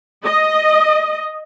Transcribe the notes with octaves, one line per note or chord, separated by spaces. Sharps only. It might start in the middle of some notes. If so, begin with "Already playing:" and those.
D#5